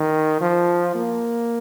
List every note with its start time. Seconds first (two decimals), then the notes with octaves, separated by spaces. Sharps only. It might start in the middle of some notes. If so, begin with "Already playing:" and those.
Already playing: D#3
0.41 F3
0.95 A#3